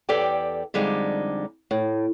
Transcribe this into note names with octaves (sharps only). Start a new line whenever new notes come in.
E2 G4 A4 D5 G5
F2 D3 G3 G#3 D#4
A2